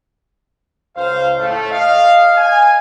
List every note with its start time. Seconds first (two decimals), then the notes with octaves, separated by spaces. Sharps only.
0.96 C#2 C5 F5
1.39 A2 A3
1.71 D#5 F5
2.36 G#5